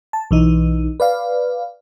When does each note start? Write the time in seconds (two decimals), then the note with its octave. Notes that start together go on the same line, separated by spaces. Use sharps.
0.13 A5
0.31 B1 E3 D#4
1.00 B4 D5 F5